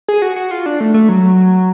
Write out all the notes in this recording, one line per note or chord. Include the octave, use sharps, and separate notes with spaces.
G#4
F#4
F#4
F4
D4
A3
A3
F#3